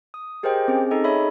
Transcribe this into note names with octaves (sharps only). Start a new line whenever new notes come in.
D#6
G4 G#4 A#4 C5 D#5 G5
C4 C#4 G#4
D#4 G#4 A4 D#5
C#5 E5 B5